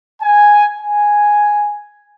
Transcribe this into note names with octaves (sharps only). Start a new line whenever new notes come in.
G#5
G#5